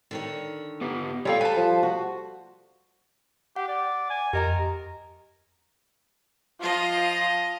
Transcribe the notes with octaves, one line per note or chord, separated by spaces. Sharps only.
D3 D#3 C#5
B3 G4 B4
G3 F4 A4 C#5 F5 G5
B4 C5 G#5 A5
F3
F#4
G4 F#5
D5
G#5
F2 G4 A#4 D#5 A#5
F3 F4 D#5